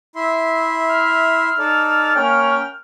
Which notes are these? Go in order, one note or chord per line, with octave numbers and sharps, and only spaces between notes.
E4 E5 C6
F6
D#4 A4 D5
A#3 C#4 G5